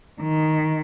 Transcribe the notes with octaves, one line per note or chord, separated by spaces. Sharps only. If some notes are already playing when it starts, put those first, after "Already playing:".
D#3